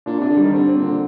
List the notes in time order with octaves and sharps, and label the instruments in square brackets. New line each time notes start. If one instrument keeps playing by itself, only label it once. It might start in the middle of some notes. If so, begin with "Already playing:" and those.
[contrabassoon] A#2 [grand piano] D4
[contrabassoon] C3 [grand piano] D4
[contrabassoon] D3
[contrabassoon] D#3 [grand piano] G3
[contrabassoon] D3 [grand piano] C4
[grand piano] C4
[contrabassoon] A#2
[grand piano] D3